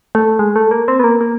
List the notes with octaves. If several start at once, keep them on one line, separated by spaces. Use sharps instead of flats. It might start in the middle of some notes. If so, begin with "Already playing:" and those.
A3
G#3
A3
A#3
C4
B3
A#3
A#3